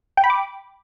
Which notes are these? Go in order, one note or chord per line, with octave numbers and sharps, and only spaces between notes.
G5
B5
D6